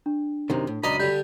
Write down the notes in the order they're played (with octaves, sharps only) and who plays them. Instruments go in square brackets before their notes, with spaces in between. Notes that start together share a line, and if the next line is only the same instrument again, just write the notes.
[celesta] D4
[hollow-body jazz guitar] F#2 C3 D#3
A2
[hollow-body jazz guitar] C#2 F#2 A#5 [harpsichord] D5 D#5 D#6 [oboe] B5
[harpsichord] D3 G3 [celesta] G6